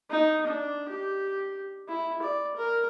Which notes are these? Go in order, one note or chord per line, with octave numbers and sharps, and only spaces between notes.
D#4
D4
G4
E4
D5
A#4